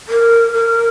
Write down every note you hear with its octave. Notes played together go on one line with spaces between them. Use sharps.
A#4
A#4